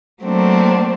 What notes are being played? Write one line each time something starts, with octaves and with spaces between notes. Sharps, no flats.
F#3 A3 A#3 C4 D4